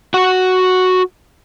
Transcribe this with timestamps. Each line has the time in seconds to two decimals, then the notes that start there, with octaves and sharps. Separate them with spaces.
0.14 F#4 F#5